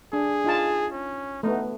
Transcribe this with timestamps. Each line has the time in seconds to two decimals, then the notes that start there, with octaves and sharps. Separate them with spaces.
0.13 D4 G#4
0.45 D#4 F4 A5
0.93 C#4
1.43 A3 B3 D#4